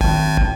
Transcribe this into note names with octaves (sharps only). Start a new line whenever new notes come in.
G#1